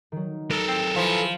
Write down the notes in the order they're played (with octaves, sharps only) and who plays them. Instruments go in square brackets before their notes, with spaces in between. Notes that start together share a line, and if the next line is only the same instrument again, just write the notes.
[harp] D#3 F#3
[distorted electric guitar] A4 A#4
[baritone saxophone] C4
[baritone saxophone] E3 [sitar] F3